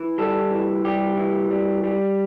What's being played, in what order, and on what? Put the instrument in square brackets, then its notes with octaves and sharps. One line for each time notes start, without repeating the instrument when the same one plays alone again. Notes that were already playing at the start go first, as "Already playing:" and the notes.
Already playing: [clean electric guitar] E3
G3 A4
E3
G3 G4
E3
G3
G3